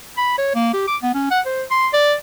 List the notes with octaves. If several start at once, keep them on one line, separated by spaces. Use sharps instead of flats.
B5
C#5
A#3
G4
D6
B3
C#4
F#5
C5
C6
D5